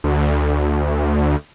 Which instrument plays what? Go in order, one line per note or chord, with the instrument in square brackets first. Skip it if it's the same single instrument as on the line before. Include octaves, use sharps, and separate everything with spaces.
[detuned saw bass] D2